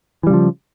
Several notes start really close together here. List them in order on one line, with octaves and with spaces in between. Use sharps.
E3 G3 C#3 F3